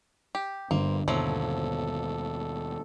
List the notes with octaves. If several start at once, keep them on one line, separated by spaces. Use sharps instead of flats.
G4
G1 G2 A#3 C5
D#2 B2 F3 F#3 E4 A4